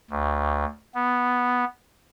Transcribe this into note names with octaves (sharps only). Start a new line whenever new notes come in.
D2
B3